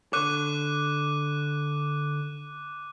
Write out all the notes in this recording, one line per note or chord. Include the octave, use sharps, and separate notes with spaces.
D3 C#5 D6 F#6 D#7